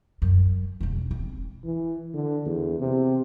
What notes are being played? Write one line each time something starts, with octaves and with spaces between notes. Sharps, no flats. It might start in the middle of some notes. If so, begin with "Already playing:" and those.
F#2
E1 C#4
C4
E3
D3
E2
C3